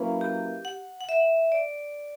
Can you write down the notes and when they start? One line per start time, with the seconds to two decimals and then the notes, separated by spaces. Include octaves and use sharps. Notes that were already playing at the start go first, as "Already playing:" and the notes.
Already playing: F#3 A#3 C#4 E4 B4
0.21 G4
0.65 F#5
1.01 F#5
1.09 E5
1.52 D5